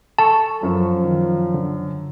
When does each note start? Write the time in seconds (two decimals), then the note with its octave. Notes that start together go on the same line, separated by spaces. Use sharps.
0.19 A4 A5 C#6
0.63 F#2 F3
1.05 D#3
1.54 D3